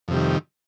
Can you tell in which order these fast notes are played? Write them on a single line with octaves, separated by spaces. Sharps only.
F2 C3 G3 D#3